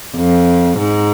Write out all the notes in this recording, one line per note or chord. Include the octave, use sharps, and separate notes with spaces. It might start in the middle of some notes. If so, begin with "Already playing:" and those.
F2
G#2